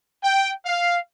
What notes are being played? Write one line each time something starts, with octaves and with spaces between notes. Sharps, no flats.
G5
F5